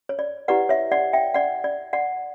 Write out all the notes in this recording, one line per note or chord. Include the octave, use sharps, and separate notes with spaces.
C#5
D5
E4 G4 B4 D5 F#5
C#5 E5
D5 F#5
E5 G5
D5 F#5
D5
D5 F#5